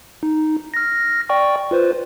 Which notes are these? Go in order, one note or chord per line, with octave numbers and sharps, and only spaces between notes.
D#4
F6 A#6
D5 G5 C#6
F4 B4 C5